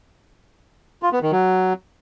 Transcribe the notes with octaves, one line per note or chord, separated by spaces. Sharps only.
F4
B3
D#3
F#3